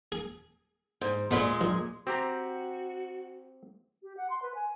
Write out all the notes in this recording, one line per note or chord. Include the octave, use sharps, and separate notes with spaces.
G#4
G#2
A#2 G#3 B3 G#4 B5
A#1
C4 F#4 G4 A#5
G4
F#5
C6
B4
G#5